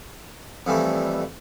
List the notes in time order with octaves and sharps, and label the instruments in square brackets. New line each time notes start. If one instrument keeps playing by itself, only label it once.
[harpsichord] F2 E3 G3 A3